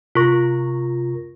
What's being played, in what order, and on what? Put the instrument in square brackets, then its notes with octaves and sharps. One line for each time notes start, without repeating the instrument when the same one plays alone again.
[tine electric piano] C3 A#4 A#6 [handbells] F4 C#6